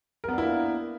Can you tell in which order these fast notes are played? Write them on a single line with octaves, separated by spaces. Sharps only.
A#4 B3 D4 E4 A#3